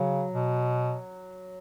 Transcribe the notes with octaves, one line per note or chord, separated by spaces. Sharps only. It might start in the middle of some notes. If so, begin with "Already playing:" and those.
Already playing: C#3 F#3
B2